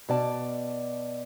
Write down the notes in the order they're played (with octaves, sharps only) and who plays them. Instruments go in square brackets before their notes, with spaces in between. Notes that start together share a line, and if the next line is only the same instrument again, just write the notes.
[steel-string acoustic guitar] B2 D5 A5